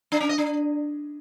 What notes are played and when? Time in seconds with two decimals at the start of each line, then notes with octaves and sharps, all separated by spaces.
0.12 D4
0.20 C#4
0.29 D#5
0.38 D4